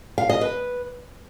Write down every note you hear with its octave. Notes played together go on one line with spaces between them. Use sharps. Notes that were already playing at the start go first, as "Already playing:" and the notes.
F5
D#5
B4